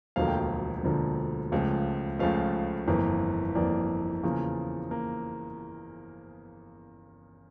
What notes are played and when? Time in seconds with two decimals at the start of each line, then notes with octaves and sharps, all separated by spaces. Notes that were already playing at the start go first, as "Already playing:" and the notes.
0.16 E1 D2 D3 F3 A#3 F5
0.28 G5
0.40 F5
0.83 E1 D2 D3 F3 A#3
1.52 C#2 C#3 F3 A3
2.19 C#2 C#3 F3 A3 F5
2.87 G1 F2 E3 A#3
3.55 G1 F2 E3 A#3 D5
4.23 E2 C#3 F3 A#3
4.91 A#3